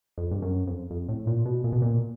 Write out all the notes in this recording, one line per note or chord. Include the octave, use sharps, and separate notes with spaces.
F2
G2
F#2
F2
F2
A2
A#2
B2
A#2
B2
A#2